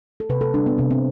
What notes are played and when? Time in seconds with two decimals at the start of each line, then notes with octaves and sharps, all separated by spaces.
0.20 A4
0.29 C3 B4
0.41 A4
0.54 G3 D4
0.66 B3
0.78 C3 C4
0.91 C4